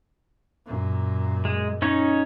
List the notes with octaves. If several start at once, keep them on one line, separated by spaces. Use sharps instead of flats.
F#2 A#2
G#3
C#4 D#4 C#5